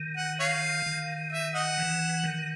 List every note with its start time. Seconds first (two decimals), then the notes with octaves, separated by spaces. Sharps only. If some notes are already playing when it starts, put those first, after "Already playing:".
Already playing: D#3
0.17 F#5
0.40 C#5 F5
0.86 D#3
1.32 E5
1.54 D#5 F#5
1.78 E3
2.24 D#3